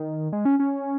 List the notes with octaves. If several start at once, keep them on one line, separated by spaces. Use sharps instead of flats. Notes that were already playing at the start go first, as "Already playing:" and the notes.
Already playing: D#3
G#3
C#4
C#4